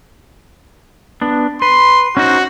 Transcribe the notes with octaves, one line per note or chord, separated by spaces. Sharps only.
B3 D4
B4 C6
C#4 D#4 F#4 C5